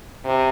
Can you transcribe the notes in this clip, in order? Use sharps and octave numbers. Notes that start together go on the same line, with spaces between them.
C3